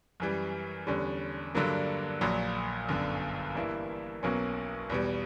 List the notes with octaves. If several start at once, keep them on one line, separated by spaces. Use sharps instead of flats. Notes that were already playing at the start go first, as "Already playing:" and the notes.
F#2 E3 G3
E2 D3 G3 C#4
G2 D3 F#3 A#3
A#1 A#2 F#3
G1 F#2 D3
G2 E3 A#3 E4
B1 B2 F#3 A#3 C#4
E2 B2 G3